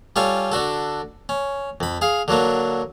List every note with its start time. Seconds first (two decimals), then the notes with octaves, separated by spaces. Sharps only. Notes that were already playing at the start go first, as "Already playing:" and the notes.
0.16 G3 C#4 F4 A4 C#6
0.52 D3 D4 F#4 A4
1.29 C#4
1.81 F2 B5
2.01 G#4 F5
2.28 D3 F#3 A#3 D4